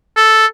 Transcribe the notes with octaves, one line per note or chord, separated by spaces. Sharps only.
A4